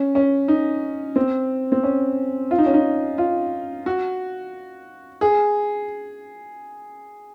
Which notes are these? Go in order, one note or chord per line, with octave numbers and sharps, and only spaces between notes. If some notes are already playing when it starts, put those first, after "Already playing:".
Already playing: C#4
C#4
D#4
C4
C4
C#4
F4
D#4
C#4
D#4
F4
F#4
G#4